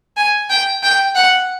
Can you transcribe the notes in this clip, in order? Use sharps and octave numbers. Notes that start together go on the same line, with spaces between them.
G#5
G5
G5
F#5